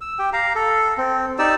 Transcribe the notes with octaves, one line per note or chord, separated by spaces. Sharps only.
E6
G4 G5
F5 A#5
A4
C4
D#4 G4 D5 E6